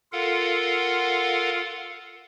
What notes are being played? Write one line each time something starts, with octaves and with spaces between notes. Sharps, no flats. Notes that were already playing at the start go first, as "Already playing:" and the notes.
F4 A4 A#4 F5 F#5